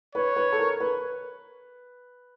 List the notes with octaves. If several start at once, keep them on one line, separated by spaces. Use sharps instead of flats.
B4 C#5
B4
A4
A#4
B4